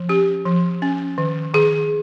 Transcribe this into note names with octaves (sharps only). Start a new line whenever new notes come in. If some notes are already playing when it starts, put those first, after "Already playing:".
Already playing: F3
C#4 G4
F3
C#4
D#3
D#3 G#4